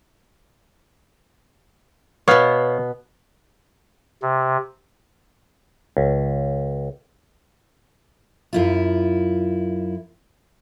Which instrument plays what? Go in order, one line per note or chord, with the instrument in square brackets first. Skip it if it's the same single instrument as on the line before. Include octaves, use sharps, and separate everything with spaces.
[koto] B2 B3 [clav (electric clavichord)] C#5 F5
[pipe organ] C3
[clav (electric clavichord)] C#2
[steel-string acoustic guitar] F#2 E4 F4